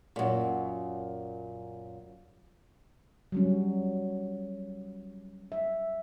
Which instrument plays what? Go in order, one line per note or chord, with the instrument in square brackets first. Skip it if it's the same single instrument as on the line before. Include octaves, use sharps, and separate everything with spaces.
[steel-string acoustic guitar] F#2 A#2
[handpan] F#3 G3 C#4
E5